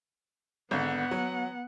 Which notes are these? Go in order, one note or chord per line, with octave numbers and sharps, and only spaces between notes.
G#1 D3 B3 F#5
F#3